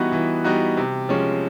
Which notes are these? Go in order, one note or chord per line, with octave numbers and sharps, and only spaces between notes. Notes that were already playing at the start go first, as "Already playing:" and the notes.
Already playing: E3 G3 B3 D#4 F#4
E3
G3 B3 D#4 F#4
C3
F3 G#3 C#4